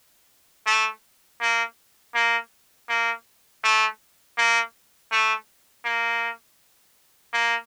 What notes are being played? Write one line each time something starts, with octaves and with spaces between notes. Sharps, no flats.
A3
A#3
A#3
A#3
A3
A#3
A3
A#3
A#3